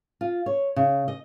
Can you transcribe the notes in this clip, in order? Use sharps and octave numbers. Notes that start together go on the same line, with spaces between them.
F4
C#5
C#3
D#5